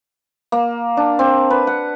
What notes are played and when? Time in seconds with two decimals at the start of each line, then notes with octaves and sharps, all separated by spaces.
0.52 A#3
0.97 D4
1.19 C4
1.50 B4
1.67 F#5